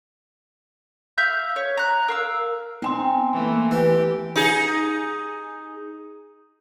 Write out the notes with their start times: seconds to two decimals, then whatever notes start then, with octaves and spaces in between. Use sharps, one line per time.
1.18 E5 F5 E6 G6
1.56 C#5
1.77 A#5 F#6
2.08 A#4 F5 E6
2.82 B3 C4 D#4 G#5 C6
3.33 E3 A3 A#3
3.71 E3 G4 A4
4.36 D#4 G#4